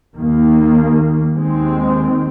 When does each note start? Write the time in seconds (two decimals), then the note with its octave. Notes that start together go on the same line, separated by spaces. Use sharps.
0.16 D#2 D#3 A#3
1.33 D#2 D#3 G#3 C4